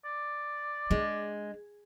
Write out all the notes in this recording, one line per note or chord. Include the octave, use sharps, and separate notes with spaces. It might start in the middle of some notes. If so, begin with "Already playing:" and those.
D5
G#3 D4